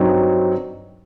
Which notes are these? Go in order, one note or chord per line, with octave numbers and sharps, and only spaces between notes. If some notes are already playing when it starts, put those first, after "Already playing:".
Already playing: G2 F#3 C4 D#4